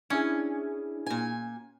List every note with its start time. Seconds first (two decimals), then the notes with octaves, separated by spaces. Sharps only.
0.10 C#4 D4 E4 G#4
1.06 A#2 G#5